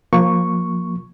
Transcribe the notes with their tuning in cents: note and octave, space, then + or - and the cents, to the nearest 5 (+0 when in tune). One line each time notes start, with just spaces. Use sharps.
F3 +20 A#3 +0 C#6 +0